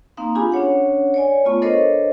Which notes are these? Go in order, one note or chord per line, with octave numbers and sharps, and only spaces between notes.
A#3 C4 D#4 F5
D4 F4 G4 G#4 G#5 B5
C#4 D4 C#5 F#5
C#5 D5 G#5
A3 B3 F4 C#6
D4 A4 A#4 C5 C#5 D#5